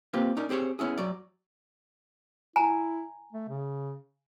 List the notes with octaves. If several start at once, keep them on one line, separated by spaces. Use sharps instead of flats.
A#3 C4 F4 G4 B4
C#4 D#4 A#4 D5
C4 G4 G#4 C5 C#5
B3 C#4 E4 G#4
F#2 F#3 D5
E4 G#5 A#5
A3
C#3